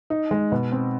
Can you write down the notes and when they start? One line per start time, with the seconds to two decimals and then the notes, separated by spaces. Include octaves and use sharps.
0.10 D#4
0.31 G#3
0.52 B2
0.72 C4